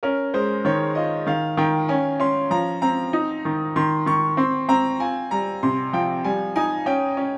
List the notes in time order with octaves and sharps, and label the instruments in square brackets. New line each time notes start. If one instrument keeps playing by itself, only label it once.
[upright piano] C#4 [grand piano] A#4
[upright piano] G#3 [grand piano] C5
[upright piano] D#3 [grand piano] C#5
[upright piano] F4 [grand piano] D#5
[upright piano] D#3 [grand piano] F5
[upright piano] D#3 [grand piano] G5
[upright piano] C#4 [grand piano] G#5
[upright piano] C#4 [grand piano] C6
[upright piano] F3 [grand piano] A#5
[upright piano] C4 [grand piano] A#5
[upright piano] D#4
D#3
[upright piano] D#3 [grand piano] C6
[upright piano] D#3 [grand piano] C#6
[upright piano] C4 [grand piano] C6
[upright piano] C4 [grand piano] A#5
[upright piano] F4 [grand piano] G#5
[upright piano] G3 [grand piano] A#5
[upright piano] C3 [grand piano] C6
[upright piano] F3 [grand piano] G5
[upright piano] G3 [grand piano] G#5
[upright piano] D#4 [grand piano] G#5
[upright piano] C#4 [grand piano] G5
[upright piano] C#4